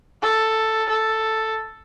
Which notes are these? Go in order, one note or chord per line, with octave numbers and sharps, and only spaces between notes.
A4
A4